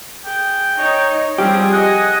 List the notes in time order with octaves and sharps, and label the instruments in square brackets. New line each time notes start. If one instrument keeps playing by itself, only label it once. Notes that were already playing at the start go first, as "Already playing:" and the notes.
[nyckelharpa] G#4 [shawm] G5
[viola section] D#4 [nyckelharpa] C#5
[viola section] F3 G3 C4 [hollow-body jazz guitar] G4 [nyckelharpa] G#4 [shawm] F5
[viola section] D#5 G#5 [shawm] F#5